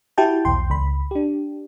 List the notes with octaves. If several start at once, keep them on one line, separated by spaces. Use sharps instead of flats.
E4 F#4 G4 G5 A5
B1 E2 G5 C6
C#2 B5
D4 G4